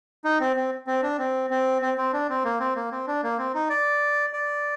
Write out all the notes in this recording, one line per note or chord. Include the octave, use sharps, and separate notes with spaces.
D#4
C4
C4
C4
D4
C4
C4
C4
C4
D4
C4
A#3
C4
A#3
C4
D4
A#3
C4
D#4
D5
D5